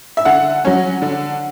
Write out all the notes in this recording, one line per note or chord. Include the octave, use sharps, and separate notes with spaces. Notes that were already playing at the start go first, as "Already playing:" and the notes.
E5
D3 F#5
F#3 C#4
D3